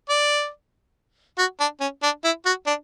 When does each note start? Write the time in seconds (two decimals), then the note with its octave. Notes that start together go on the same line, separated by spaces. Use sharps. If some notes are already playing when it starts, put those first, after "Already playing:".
0.09 D5
1.38 F#4
1.60 D4
1.81 C#4
2.03 D4
2.24 E4
2.46 F#4
2.67 D4